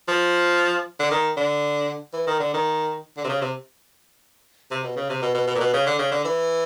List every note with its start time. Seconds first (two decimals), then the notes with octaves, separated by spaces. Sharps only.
0.08 F3
0.99 D3
1.11 D#3
1.37 D3
2.13 E3
2.27 D#3
2.40 D3
2.53 D#3
3.17 D3
3.24 C3
3.29 C#3
3.42 C3
4.71 C3
4.84 B2
4.96 C#3
5.09 C3
5.22 B2
5.34 B2
5.47 B2
5.55 A#2
5.60 B2
5.73 C#3
5.86 D3
5.99 C#3
6.12 D3
6.24 E3